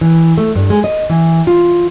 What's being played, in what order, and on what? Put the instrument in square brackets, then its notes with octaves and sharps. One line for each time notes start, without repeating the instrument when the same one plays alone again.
[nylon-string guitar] E3
A3
G2
G#3
D#5
E3
F4